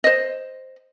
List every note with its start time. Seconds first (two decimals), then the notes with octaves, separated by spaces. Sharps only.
0.04 C5 D#5